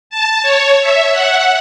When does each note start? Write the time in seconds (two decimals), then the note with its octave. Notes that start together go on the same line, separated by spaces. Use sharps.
0.10 A5
0.43 C#5
0.81 E5
1.12 F#5